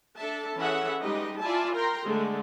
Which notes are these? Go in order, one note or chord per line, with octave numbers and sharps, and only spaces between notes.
D4 A4 E5 A5
E3 C#4 G#4 A4 E5 F#5
G3 G#3 D#4 G4 B4 D#5
E4 F4 D5 E5 G#5 A5
A#4 G5 A#5 C6
D3 G#3 A3